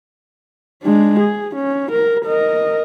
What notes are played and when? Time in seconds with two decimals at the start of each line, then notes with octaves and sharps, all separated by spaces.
0.83 G#3 D4
1.20 G#4
1.56 C#4
1.91 A#4
2.25 A#4 D#5